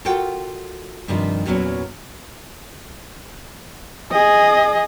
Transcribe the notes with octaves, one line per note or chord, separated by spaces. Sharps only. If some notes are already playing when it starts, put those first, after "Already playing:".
F4 F#4 A4 A#4 F#5 G5
G2 C3 D#3 F3 G3
E2 A#2 F#3 B3 C#4
G#4 D#5